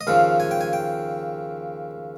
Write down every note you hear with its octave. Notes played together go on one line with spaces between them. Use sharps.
D#5
D#2 C#3 F3 F5
G#5
G5
G#5
G5